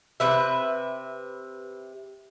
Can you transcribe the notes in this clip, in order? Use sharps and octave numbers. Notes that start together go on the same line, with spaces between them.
C3 B4 E5